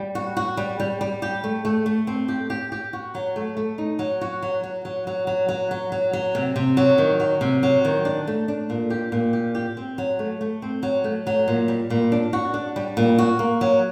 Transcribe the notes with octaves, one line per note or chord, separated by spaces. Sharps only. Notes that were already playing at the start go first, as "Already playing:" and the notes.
Already playing: G3
F#4
F#4
G3
G3
G3
G4
A3
A3
A3
C4
G4
G4
G4
F#4
F#3
A3
A3
D#4
F#3
F#4
F#3
F#3
F#3
F#3
F#3
F#3
F#3
F#3
F#3
C3
C3
F#3
D#3
F#3
C3
F#3
D#3
D4
A3
D4
A#2
G4
A#2
G4
G4
C4
F#3
A3
A3
C4
F#3
A3
F#3
A#2
G3
A#2
D4
F#4
D4
G3
A#2
F#4
A#3
F#3